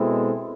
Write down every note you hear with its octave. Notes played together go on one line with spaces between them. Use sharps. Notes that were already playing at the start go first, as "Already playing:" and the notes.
Already playing: B2 G#3 C4 E4 A4